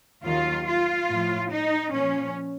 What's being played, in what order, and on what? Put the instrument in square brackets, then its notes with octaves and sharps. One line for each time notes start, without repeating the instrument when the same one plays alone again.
[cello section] D#2 D#3 F#3 F4
F4
A2 F3
D#4
A#2 F3 C#4